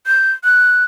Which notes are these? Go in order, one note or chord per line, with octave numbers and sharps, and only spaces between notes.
G6
F#6